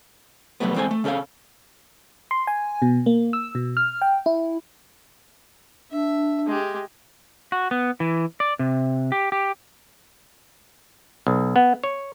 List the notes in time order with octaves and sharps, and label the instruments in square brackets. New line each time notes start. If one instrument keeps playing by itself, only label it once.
[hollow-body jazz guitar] B2 F#3 G3 A3 B3
E2 G#3 C4 A4 C5 G#5
A3
C#3 C#4 A4 C#5 F5
[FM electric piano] C6
G#5
B2
A#3
E6
B2
F6
G5
E4
[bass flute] D4 [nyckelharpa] E5
[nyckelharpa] G#3 G4
[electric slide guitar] F#4
B3
E3
D5
C3
G4
G4
[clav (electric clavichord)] B1
B3
C#5